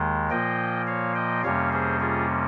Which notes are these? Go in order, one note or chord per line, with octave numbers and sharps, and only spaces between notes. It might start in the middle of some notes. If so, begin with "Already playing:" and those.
Already playing: D#2 D#3 G#3
A#2 F3 A#3 D#5 G5
C#5 F5
D#5 G5
F2 C3 G3 A#3 C#4 C#5 F5
G#4 C5
F4 G#4